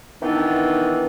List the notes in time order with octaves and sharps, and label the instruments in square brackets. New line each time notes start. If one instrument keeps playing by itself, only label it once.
[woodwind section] D#3 E3 B3 C4 D4 D#4